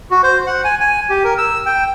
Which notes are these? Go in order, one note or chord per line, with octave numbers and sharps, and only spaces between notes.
F#4
C5
F#5
G#5
G#5
G4
A#4
E6
G5